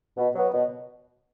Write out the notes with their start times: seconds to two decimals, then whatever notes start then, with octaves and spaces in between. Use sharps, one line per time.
0.17 B2
0.35 F#3 B3
0.53 B2